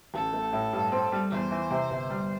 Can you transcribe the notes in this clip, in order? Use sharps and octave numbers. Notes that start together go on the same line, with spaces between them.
A1 A4
A3
A2
G2
C4
G3
E2 C5
E3
C3
G1
G3